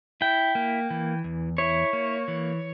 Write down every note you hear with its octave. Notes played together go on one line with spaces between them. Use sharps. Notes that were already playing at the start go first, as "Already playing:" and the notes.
E4 G5
A#3
E3
E2
E4 C#5
A#3
E3